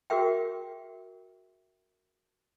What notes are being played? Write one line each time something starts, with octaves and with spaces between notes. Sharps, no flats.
F#4 G#4 A#4 E5 G5